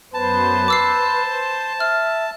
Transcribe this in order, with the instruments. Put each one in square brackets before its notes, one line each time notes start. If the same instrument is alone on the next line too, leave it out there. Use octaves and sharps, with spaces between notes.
[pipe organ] F#2 B3 C5 [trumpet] B4 [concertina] A5
[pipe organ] C5 [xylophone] D6 E6 C7
[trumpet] E5 [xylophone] F6